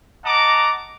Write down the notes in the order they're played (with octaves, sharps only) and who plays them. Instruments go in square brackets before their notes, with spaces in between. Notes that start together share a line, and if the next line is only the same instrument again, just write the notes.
[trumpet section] D#5 F#5 A5 A#5 D6